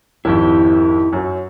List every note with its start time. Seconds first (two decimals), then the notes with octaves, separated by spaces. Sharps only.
0.25 G#1 F2 E4 G4
1.13 F#2 F#3